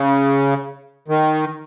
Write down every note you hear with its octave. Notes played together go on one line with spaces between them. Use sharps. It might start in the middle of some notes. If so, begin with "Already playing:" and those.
Already playing: C#3
D#3